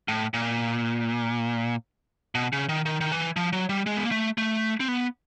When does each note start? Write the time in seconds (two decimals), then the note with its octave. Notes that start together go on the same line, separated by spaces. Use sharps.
0.08 A2
0.34 A#2
2.35 B2
2.53 C#3
2.69 D#3
2.85 D#3
3.01 D#3
3.12 E3
3.36 F3
3.53 F#3
3.69 G3
3.86 G#3
3.97 B3
4.04 A#3
4.11 A3
4.38 A3
4.80 C4
4.88 B3